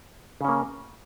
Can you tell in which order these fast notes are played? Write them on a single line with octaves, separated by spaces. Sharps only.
C#3 C#4 A#3